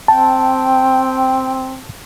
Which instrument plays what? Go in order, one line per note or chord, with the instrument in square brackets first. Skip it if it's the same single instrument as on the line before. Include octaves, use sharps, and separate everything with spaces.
[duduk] C4 [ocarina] G5 [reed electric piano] A5